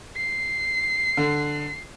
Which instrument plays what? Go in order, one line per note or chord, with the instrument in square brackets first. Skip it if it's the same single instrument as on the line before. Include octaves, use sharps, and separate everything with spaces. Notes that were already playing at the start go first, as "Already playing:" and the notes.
[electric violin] C7
[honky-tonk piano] D3